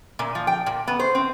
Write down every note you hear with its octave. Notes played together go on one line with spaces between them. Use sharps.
A#2
F3
G5
A#2
B3
C5
C4